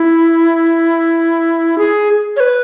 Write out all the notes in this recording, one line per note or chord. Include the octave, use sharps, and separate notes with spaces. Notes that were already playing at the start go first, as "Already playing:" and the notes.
Already playing: E4
G#4
C#5
B4